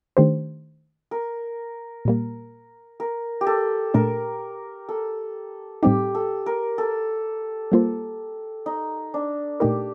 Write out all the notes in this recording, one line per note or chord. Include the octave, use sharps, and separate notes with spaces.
D#3 A3 D4 G4 C5
A#4
A#2 G3 A#3
A#4
G4
A4
A#2 A3 D4 A#4
A4
A2 G3 C4 D#4 G4
A4
A#4
A4
G3 A#3 F4 C5
D#4
D4
A#2 A3 D#4 G4 A#4